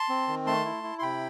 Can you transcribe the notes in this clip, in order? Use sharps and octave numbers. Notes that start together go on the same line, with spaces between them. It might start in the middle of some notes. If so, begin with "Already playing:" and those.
Already playing: A5 C6
C4
D#3
A3 A5 C6
E4
E4
C6
C3 G5 B5